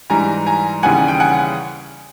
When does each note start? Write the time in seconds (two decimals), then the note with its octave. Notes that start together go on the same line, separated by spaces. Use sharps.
0.10 G#2 E3 G3 G#5 A#5
0.46 G#5 A#5
0.83 D#2 C#3 E3 G3 F#5 G#5
1.08 G5
1.20 F#5 G#5